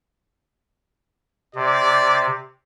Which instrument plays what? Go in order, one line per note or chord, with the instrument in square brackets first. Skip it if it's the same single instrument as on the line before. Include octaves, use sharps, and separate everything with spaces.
[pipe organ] C3 [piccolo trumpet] D5